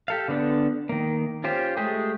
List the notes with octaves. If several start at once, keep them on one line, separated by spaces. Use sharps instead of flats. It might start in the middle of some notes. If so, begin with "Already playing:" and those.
G4 A4 F5
D3 B3 D4
D#3 A#3
C#4 F4 G4 C5
G#3 A3 G4 G#4